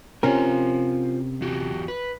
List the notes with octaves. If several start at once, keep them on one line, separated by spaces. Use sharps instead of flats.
C3 C#4 F4 A#4 C5 G#5
E2 F#4 G4
B4